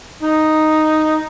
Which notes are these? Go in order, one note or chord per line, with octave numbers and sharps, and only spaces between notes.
D#4